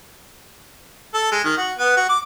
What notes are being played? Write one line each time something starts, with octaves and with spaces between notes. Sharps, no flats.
A4
G#3
D#3
F#4
B3
F#4
D6